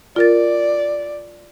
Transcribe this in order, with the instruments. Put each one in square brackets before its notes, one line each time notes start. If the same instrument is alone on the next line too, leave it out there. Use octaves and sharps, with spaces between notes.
[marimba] F4 A#4 A6 [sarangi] D5